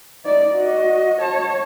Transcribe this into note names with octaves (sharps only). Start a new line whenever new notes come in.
D#4 D5
F#4 D#5
C#5 A5